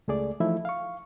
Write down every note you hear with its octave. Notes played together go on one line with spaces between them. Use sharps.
C#2 A3 G#4 D5
E3 F3 A3 D#4 E4 E5
F5 C#6